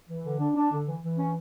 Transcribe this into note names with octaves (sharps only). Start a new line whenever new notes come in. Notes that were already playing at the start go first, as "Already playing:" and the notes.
E3
D3
D4
D4
D3
E3
E3
C#4